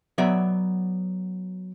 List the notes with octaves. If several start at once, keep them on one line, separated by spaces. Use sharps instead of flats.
F#3 B3 C#5 D5 E5